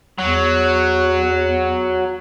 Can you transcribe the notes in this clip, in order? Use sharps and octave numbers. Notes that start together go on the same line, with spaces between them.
E2 F#3